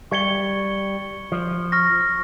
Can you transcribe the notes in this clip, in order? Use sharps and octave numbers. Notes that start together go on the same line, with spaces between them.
G3 C#6 G#6 C#7 G7
F3
C#6 F6 A#6